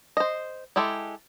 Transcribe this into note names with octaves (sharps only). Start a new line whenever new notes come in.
C5 D#5
G#3 E4 G4 A4